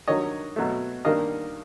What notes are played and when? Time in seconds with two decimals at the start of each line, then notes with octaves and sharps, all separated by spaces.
0.08 G2 D#3 F#3 C#5 D#5
0.56 B2 F#3 A3
1.05 G2 D#3 G3 A#3 D#5 F5